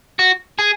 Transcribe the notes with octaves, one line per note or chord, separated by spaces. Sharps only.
F#4
G#4